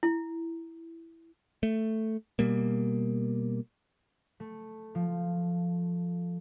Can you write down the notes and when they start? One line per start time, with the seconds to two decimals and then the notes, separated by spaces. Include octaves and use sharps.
0.03 E4
1.63 A3
2.39 B2 G3 A#3
4.40 A3
4.95 F3